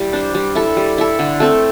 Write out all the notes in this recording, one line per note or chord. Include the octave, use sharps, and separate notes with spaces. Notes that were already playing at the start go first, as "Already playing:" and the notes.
Already playing: G3 E4
D4 C5
G3
E4 A4
G3
E4 A4
D3
A3 C4 A4